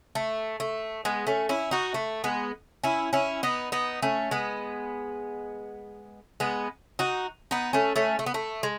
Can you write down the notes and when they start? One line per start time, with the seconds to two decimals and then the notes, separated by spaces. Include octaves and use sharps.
0.15 A3
0.60 A3
1.05 G#3 B3
1.27 A3 C#4
1.49 C#4 E4
1.71 D#4 F#4
1.94 A3
2.24 G#3 B3
2.84 C#4 E4
3.13 C#4 E4
3.43 B3 D#4
3.72 B3 D#4
4.02 A3 C#4
4.31 G#3 B3
6.40 G#3 B3
6.99 D#4 F#4
7.51 B3 D#4
7.73 A3 C#4
7.96 A3 C#4
8.19 A3
8.26 B3
8.34 A3
8.63 G#3